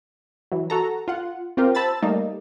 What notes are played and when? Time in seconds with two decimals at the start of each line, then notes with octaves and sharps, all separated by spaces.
0.52 E3 F#3
0.70 F#4 A4 A#5
1.08 F4 F#5
1.57 C4 F4 G4 A#4
1.75 C5 A5 B5 E6 A6
2.02 G3 A3 A#3 D#4